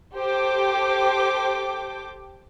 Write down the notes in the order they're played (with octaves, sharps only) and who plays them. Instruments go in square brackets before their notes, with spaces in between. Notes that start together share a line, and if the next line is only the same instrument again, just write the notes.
[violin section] G4 A4 C5 G5 D6